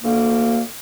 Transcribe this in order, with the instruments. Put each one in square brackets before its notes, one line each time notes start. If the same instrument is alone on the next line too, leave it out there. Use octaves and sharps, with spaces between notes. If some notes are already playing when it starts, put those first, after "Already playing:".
[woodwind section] D2 A#3